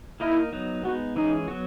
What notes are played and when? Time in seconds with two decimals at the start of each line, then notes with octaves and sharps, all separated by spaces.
0.20 A#3 D#4 E4 A#4 D#5
0.53 F#3 B3 D#4
0.84 G#3 B3 D#4 F#4
1.16 E3 G#3 C#4 D#4 G#4
1.48 F#3 B3 F#4